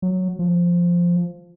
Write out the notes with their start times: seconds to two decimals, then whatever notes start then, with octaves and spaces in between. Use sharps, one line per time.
0.02 F#3
0.39 F3